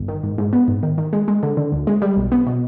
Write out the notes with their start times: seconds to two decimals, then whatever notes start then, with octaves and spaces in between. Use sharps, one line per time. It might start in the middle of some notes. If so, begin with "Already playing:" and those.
Already playing: G1
0.08 D#3
0.23 G#2
0.38 G#2
0.53 B3
0.68 G#2
0.83 D#3
0.98 D#3
1.13 G#3
1.28 G#3
1.43 D3
1.57 D3
1.72 D2
1.87 G#3
2.02 G3
2.16 B1
2.32 B3
2.47 B2